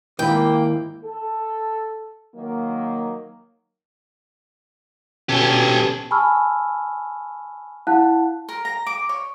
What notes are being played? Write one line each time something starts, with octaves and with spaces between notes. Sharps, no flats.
D#2 G#2 A#3 E4 G5 B5
A4
D#3 F#3 A#3
B2 C#4 G4 A4 G#5
G#5 A5 B5 C#6 E6 F6
E4 F5 F#5 A5 F#6
A#4
A#5
D6
C#5